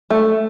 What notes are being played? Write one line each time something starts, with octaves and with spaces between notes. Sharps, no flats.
A3